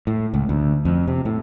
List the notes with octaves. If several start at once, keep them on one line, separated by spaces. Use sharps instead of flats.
A2
C#2
D2
F2
C3
A2